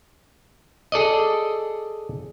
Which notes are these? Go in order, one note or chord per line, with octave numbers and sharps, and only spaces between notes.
G#4 A4 D5 D#5